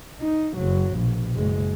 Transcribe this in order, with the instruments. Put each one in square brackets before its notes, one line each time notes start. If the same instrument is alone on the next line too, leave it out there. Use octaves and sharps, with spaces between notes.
[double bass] D#4
F#1 F#3
A#1 B2
F#1 G#3